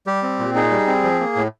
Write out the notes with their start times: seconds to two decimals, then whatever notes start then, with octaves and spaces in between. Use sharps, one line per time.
0.07 G3 G4
0.23 C4
0.39 A#2
0.55 D#4 G#4
0.71 G3
0.87 C4
1.04 F3
1.20 A#3
1.36 A2